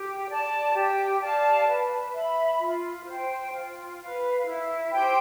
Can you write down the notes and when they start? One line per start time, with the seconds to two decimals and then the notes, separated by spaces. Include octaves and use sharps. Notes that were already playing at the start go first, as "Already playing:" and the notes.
Already playing: G4
0.28 D5 A5
0.74 G4
1.20 D5 F5 A5
1.67 B4
2.14 E5 B5
2.60 F4
3.06 C5 G5
3.53 F4
4.00 B4 F5
4.46 E4
4.92 G4 C5 G5